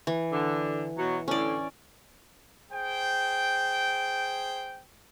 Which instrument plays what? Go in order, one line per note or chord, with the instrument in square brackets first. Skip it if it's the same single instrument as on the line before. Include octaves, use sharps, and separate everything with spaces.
[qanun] E3
[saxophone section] D3
B2 F#3
[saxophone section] A2 D3 [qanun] C#4 D5
[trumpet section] G#4 C5 G5